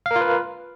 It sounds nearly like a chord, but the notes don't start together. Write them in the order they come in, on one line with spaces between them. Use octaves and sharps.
F5 A#4 F4 B4